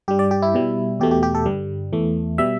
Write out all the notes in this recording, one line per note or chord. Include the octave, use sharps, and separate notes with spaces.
G2 G3 G4
D5
G4
E4
B2 G3
E2 B2 A3 G4
G4
G4
A4
G2 D3 G3
E2 E3 A3
B2 G3 E5